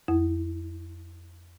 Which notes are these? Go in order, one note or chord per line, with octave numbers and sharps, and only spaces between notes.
F2 E4